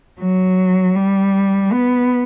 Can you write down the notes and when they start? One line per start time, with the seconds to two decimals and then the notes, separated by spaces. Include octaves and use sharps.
0.20 F#3
0.96 G3
1.71 B3